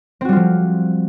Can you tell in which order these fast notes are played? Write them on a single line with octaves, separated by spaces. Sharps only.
C4 F#4 G3 F4 F3